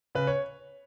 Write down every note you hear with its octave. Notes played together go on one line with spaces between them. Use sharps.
C#3 B4
C#5